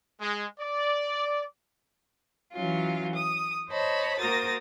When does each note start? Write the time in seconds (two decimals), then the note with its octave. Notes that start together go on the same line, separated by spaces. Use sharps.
0.20 G#3
0.59 D5
2.53 E3 F#3 C#4 F4
3.14 D#6
3.71 C5 C#5 D#5 A5 B5
4.20 A#3 F#4 A#4 C5 D#6 A6